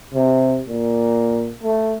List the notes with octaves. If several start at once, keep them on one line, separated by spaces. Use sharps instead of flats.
C3
A#2
A3